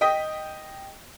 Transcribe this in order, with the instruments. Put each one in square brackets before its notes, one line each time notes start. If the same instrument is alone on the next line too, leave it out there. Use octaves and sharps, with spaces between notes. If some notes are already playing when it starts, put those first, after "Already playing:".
[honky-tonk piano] D#5 G5 D#6 B6